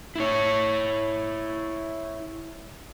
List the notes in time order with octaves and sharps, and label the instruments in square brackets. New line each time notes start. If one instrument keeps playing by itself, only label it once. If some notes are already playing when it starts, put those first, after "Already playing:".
[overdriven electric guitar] E4 C#5